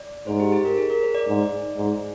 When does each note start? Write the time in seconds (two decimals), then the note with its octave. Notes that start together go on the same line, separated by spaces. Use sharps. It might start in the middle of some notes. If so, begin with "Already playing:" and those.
Already playing: D5
0.27 G#2 C5
0.40 G4
0.52 G#4
0.65 A#4
0.78 G#4
0.90 A#4
1.02 C5
1.15 D5
1.27 G#2
1.77 G#2